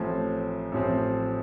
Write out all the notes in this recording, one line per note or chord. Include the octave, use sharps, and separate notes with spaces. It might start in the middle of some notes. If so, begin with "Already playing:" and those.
Already playing: A1 A2 F3 C4
A1 A2 F3 C4